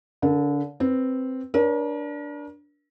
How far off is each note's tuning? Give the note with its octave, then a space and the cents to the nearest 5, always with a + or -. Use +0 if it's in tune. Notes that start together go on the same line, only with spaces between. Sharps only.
D3 -30 A#4 +0
C4 +0 B4 +0
D4 -5 A#4 +40 C#5 +0